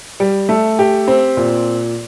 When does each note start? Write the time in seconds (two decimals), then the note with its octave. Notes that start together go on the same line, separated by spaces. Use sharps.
0.20 G3
0.49 A3
0.79 G4
1.08 C4
1.37 A#2